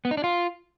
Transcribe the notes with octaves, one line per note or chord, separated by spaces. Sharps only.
B3
D#4
D4
F4